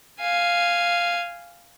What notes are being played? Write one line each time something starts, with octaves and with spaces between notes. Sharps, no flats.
F5 G#5